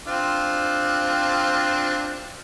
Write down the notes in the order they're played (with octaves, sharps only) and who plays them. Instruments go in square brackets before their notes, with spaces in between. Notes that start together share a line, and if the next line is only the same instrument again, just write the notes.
[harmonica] C4 D4 F4